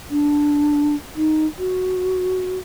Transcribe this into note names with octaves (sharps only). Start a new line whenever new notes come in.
D4
D#4
F#4